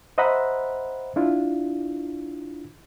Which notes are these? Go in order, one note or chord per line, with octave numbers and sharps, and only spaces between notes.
C5 D#5 E5 F#5 A#5 B5
D4 E4 F4